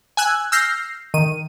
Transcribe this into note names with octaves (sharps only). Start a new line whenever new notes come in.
G#5 E6 F#6 G#6
E6 F6 G6 A#6 C7
D#3 D#7